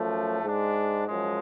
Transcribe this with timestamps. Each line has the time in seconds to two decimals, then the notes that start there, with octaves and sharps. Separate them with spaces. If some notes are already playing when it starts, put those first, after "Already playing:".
Already playing: F#2 F3 A3
0.42 G#2 G#3 D4
1.07 F#2 F3 G#3